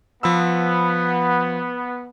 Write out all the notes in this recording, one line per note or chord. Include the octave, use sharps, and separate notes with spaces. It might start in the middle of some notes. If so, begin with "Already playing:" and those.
F3 B3 B5 E6